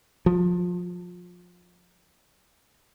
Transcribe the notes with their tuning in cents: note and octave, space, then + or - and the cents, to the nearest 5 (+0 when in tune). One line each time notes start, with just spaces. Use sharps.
F3 +25